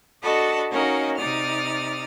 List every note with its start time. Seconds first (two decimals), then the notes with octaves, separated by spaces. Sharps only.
0.22 D4 F#4 A4 D#5 A5 B5
0.70 C#4 D#4 F#4 A#4 D#5 F5
1.17 C3 D#4 D5 D#6 F6